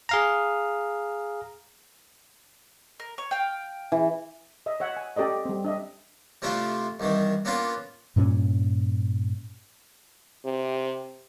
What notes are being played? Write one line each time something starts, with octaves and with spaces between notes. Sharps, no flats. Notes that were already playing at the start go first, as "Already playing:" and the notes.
G#4 F5 A#5
A#4
C#5
F5 G5
E3
D#5 E5
C#5 E5 F#5
G#5
C#4 G4 A4 D5 D#5
G3 C4
D4 D#5 E5
C3 F3 A3 D4 E4 F4
C2 D#3 E3
A#3 B3 C#4 D4 F4 B4
G2 A#2 A#3 C#4
C3